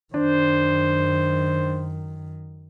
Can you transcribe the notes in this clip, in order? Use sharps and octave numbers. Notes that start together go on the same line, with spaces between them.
F#2 D#3 D4 C5